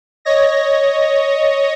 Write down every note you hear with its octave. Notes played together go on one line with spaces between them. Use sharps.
C#5 D#5 A#6